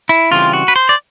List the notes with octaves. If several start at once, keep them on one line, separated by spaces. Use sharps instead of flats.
E4
C#3 E3 G3 C4 F4
F#4
B4
C5
D5